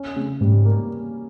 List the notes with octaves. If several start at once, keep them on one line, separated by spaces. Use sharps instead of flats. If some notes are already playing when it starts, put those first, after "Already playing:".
Already playing: C#4
C#3
G#2 G3
A#3